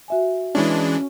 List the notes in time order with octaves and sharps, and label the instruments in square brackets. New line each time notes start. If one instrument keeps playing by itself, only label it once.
[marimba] F#4 E5 G#5
[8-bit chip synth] E3 G#3 D4 [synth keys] C#4